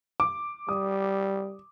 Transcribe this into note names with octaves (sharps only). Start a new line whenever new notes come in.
D6
G3 D#6